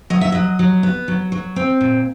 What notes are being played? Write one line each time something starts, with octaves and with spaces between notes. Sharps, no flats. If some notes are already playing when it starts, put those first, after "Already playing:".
F#3 D#5
E5
F#3 D#5
F#3
B3
F#3
F#3
C4
A#2